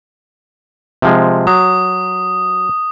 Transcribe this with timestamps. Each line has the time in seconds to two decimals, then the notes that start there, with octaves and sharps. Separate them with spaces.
1.02 C3 F3 G#3
1.47 F#3 D#6